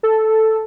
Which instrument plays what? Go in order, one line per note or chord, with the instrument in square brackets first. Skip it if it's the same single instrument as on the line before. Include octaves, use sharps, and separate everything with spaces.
[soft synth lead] A4